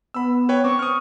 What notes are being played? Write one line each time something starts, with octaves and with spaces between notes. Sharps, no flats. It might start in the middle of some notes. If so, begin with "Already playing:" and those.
B3 B5 E6
B4 C#5 G5
C4 C#6 D6
D#6 F6